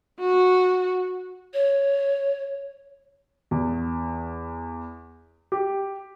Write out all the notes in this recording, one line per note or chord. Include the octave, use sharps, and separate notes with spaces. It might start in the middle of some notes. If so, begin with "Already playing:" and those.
F#4
C#5
E2
G4